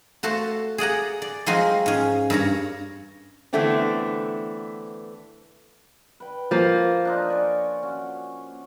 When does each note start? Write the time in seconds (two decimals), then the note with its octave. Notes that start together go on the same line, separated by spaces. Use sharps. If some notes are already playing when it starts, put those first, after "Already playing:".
0.23 A3 F#4 C5 A5
0.78 G#4 D5 F#5 A#5
1.22 D5
1.46 F3 F#3 G#3 C4 F4 F#4
1.86 G#2 C#4
2.30 G2 A#4 C#5 A#5
3.53 D3 E3 A3 B3 C4 D4
6.20 B4 G5
6.51 F3 A#3
7.05 D4 D#4 F4
7.28 C#5 D5 G#5
7.83 C#4 F#4